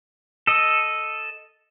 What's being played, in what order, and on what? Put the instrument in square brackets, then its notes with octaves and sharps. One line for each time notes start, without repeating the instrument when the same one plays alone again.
[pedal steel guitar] A4 D#5